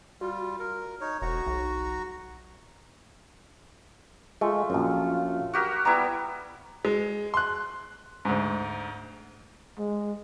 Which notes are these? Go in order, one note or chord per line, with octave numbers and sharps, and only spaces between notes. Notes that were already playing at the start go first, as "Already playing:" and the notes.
G3 F4 F#4
A#4
D#4 C#5
E1 F#4 A#5 C#6
B1
G#3 A3 F4
A#1 F#2
F#4 G4 A#4
G3 B3 E4 A#5
G#3
C6 F#6
D2 G#2
G#3